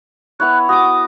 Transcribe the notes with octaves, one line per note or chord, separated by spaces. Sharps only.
B3 E4 C#5 F#6
F#4 D6 D#6